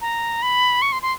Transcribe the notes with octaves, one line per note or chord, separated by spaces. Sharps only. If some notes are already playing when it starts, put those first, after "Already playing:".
A#5
B5
C#6
C6
C6